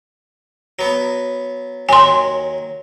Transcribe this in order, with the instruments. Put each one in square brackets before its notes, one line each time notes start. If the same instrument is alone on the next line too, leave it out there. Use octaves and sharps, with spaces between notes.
[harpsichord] F#3 B3
[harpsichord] D#2 F#3 [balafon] G#5 C6